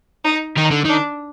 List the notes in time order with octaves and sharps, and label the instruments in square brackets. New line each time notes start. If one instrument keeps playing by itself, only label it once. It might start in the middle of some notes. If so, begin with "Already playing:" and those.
[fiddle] D#4
[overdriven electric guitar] D#3 [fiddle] D#4
[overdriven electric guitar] D3
[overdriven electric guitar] D#3 [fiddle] D4